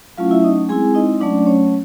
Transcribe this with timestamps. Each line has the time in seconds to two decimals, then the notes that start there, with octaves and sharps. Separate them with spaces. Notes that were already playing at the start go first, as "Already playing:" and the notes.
0.18 F#3 A3 C#4 E4 F4 F5
0.31 E4 E5
0.44 D#4 D#5
0.69 G#3 C4 E4 G#4 G#5
0.95 D#4 D#5
1.21 F#3 A3 C#4 D4 D5
1.47 C#4 C#5